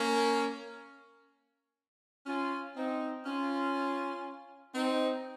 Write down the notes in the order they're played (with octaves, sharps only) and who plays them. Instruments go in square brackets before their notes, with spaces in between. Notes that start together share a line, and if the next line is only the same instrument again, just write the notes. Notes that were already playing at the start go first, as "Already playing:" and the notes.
Already playing: [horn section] A#3 C#4
C#4 F4
C4 D#4
C#4 F4
C4 D#4